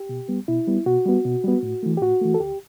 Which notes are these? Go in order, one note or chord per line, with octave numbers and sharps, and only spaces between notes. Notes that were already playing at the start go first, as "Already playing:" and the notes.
Already playing: G4
B2
G3 B3
B2 E4
G3 B3
B2 F#4
G3 B3
B2
G3 B3
A2
E3 A3
G4
A2 F#4
E3 A3
A4
D2 G4